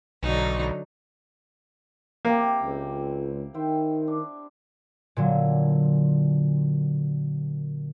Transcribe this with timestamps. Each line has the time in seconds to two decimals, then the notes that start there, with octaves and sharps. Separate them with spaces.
0.23 B1 D3 F#3 D#4
2.25 A#3 C4 E4 G4
2.64 C#2
3.54 D#3 E4 C5 G5
4.08 D4
5.17 A#2 D3 F#3